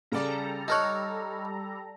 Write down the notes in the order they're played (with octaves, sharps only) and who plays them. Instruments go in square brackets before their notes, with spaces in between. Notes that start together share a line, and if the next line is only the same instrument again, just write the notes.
[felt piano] C#3 D5 [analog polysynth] G3 A4 A#5
[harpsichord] D#4 A#4 C#5 [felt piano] A5 F#6